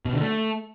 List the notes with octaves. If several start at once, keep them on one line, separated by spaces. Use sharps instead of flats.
B2
D3
A3